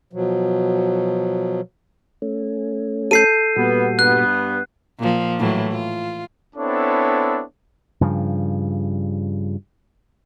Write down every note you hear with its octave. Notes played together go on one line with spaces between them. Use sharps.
B2 F3 F#3
A3 C#4
A4 G6 C7 D#7
A#2 G3 B3 F#4
G2 B3 F#6
A#2 F3
A2 E3 F#3
F4
B3 C4 D4 E4 A4 C#5
G2 C#3 F3